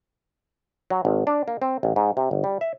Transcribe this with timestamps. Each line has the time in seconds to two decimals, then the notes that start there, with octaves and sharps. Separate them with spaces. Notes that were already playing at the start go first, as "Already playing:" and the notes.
0.90 F#3
1.05 G#1
1.27 D4
1.48 A#3
1.62 C4
1.83 A1
1.96 G#2
2.17 C3
2.31 G1
2.44 G3
2.61 E5